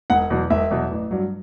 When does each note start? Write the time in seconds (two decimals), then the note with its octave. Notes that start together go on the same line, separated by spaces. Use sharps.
0.10 E1 F#5
0.30 E2 B2 F#3
0.50 E1 E5
0.71 E2 B2 F#3
0.91 A1
1.11 G2 F#3